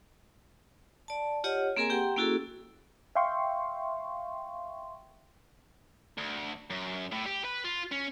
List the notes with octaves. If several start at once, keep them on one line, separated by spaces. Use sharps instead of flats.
D5 A5
F4 G4 C#5 D#5 F#5
A#3 C4 G#4 A#4 G#5 A#5
G4 F#5 G5 A#5 C6
A#3 C#4 E4 F#4 G#4 A4
E5 F5 G5 C6 C#6
D2
F#2
A2
G4
B4
F4
C#4